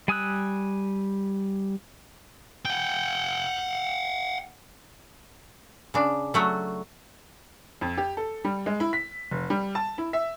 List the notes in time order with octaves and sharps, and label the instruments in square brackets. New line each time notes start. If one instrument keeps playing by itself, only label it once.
[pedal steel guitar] G3 G#5 D#6 E6 F#6
[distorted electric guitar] F#5 G5
[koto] C#3 D4
F#3 A3 F#4
[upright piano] F2
G4
A4
G3
G#3
E4
B6
F1
G3
A5
E4
E5